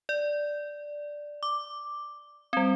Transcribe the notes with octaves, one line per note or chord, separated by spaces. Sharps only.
D5
D6
G3 C4